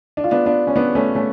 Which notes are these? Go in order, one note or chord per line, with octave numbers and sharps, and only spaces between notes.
D4
F4
B3 D4
B3 D4
C#4
B3 D4
A3 C#4
A3 C#4